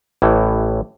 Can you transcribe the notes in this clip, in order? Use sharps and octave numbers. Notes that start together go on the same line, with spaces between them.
A1 A2 E3